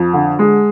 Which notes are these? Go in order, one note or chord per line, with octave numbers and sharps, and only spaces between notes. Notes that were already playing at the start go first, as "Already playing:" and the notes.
Already playing: F2
D3
G#3